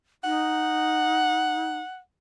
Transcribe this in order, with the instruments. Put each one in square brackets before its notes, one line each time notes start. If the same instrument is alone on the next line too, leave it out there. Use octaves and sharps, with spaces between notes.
[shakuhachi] D#4 [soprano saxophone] F#5